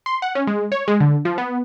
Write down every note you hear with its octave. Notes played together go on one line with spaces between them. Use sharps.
C6
F#5
C#4
G#3
C#5
G#3
D3
F3
B3